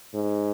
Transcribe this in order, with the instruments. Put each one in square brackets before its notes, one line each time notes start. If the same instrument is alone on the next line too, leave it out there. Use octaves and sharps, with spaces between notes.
[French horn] G#2